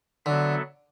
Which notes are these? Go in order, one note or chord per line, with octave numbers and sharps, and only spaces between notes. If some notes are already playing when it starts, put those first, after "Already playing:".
D3 F#3 B3 F#4 A4 E5